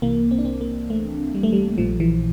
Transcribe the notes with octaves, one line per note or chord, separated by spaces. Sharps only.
C2 C3 E3 A#3
C4
D4
C4
A#3
A3
G3
A3
G3
A#1 A#2 F3
E3